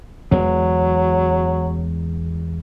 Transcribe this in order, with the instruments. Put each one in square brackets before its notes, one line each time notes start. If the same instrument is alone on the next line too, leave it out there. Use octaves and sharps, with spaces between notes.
[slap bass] E2 G#3 [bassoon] F#3